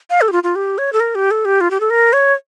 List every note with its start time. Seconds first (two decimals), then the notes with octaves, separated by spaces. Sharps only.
0.10 F5
0.21 A4
0.28 G4
0.32 F4
0.43 F4
0.55 G4
0.78 C#5
0.93 A4
1.00 A#4
1.15 G4
1.31 A4
1.45 G4
1.61 F4
1.71 G4
1.80 A4
1.90 A#4
2.13 C#5